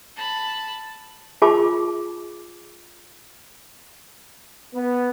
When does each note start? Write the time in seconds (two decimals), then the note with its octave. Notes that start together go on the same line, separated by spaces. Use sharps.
0.16 A5 B5
1.42 F4 G#4 A5 B5 D6
4.74 B3